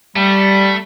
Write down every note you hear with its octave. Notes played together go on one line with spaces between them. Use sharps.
G3 A3